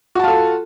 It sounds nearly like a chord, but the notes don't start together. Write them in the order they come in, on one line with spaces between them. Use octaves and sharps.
F#4 A5 F4 A4